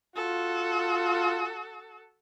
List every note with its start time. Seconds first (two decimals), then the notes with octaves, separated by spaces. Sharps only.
0.16 F4 F#4 A4